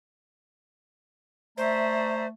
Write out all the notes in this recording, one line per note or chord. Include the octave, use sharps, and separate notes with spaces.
A3 C5 D5 E5 A#5